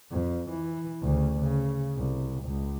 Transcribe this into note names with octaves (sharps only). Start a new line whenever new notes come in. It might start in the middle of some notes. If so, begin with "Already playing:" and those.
F2
E3
D2 C#3
C#3
C2
C#2